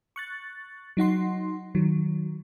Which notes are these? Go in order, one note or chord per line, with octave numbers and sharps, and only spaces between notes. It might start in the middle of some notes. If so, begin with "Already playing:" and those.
C#6 F#6 A6
F#3 D#4 F#5 C6
D#3 F#3